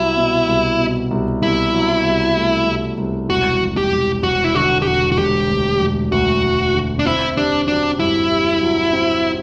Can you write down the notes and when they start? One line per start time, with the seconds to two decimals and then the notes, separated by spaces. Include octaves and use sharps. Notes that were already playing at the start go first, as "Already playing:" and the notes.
Already playing: C2 F#3 E4
0.17 B2
0.47 C2
0.79 B2
1.11 C2
1.42 C2 E4
1.73 F#3
2.05 C2
2.36 A3
2.67 C2
2.98 C2
3.30 E1 F#4
3.62 E1
3.77 G4
3.92 E1
4.23 E1 F#4
4.44 E4
4.55 D3 F#4
4.82 G4
4.87 E1 F#4
5.12 F#4
5.18 E1 G4
5.50 D2
5.80 E1
6.12 D2 F#4
6.44 E1
6.74 D3
6.99 D4
7.06 C4 E4
7.36 D4 G4
7.68 F#3 D4
7.99 G2 E4
8.31 G4
8.62 F#3
8.93 C4